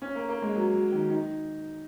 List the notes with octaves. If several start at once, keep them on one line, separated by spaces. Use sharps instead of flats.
C#4
A#3
A#3
G#3
F#3
F#3
D#3
D#4